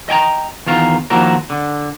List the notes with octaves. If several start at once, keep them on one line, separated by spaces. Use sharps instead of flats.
D#5 G5 G#5 A#5
E2 D#3 F4 A#4
D#3 F3 A#3 E4 F#4 A#4
D3